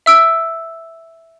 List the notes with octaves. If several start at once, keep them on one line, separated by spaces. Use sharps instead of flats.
E5 E6 D7